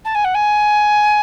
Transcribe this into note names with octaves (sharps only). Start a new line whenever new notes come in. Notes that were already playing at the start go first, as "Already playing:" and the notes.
A5
G#5
F#5
G#5